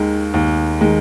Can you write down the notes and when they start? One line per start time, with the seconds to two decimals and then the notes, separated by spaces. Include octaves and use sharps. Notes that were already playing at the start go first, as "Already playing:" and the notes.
Already playing: D#2 D#3 G#3
0.34 D#2
0.81 D#3 G#3